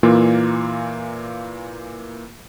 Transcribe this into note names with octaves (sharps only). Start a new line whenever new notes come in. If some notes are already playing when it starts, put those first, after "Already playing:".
A#2 E3 A#3 F4